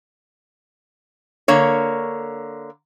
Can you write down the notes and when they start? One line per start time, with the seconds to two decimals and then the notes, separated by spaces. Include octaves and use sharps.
1.48 D3 A#3 C#5